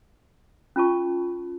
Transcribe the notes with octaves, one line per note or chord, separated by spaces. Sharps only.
C#4 F4 A5 C#6